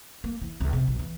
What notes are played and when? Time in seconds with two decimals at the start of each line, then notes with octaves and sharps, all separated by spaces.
0.24 A#3
0.42 E3
0.60 C#2
0.73 C3
0.87 B1
0.99 E3